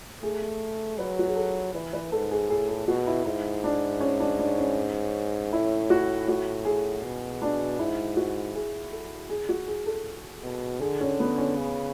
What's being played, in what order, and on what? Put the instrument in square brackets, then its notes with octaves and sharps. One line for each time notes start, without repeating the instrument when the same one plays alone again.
[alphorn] A3 [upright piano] G#4
[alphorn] F#3 [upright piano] B4
[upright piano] F#4
G#4
A4
[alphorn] E3 [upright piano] B4
[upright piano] B4
[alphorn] G#2 [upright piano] A4
[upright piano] G#4
[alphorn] A2 [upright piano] G#4
[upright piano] G#4
[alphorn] B2 [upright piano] F#4
[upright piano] E4
[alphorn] G#2 [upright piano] E4
[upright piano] D4
C#4
D4
D4
C#4
[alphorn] A2 [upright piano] E4
[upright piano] F#4
F#4
G#4
[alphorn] B2
[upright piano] D4
[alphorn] G#2 [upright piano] E4
[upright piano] F#4
G#4
A4
G#4
F#4
G#4
A4
[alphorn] B2
[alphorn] D3 [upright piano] G#4
[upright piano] C#4
B3
C#4
[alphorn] C#3